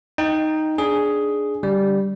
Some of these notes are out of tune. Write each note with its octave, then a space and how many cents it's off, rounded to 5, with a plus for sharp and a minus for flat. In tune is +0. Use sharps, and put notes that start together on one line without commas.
D#4 +0 G5 +0
D4 +0 G#4 +5
D3 -20 G3 +0